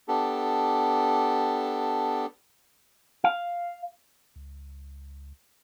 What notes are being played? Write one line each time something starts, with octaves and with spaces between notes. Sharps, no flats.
B3 D4 G4 A4
F5
C#2